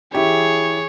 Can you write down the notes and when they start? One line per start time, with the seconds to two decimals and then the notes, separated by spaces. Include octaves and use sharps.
0.15 E3 E4 G4 G#4 C#5